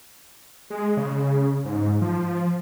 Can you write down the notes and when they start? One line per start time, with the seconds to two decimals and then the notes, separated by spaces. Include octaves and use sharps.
0.70 G#3
0.97 C#3
1.65 G#2
2.01 F3